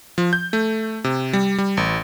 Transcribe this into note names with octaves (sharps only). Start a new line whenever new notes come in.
F3
G6
A3
C3
G3
G3
A1